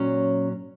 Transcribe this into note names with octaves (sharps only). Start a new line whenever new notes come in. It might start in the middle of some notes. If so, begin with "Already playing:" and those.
Already playing: A#2 F#3 C#4